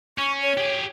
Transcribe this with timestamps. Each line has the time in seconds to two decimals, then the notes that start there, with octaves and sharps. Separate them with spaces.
0.18 C#4 C#6
0.42 C#5
0.57 G4 G#4